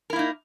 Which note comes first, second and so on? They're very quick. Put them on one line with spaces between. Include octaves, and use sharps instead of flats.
A#4 E4 A#3 D#4